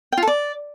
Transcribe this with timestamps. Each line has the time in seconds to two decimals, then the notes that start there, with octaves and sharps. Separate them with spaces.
0.12 G5
0.17 F4
0.23 A4
0.28 D5